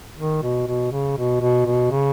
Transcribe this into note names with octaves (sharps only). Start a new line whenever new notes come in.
D#3
B2
B2
C#3
B2
B2
B2
C#3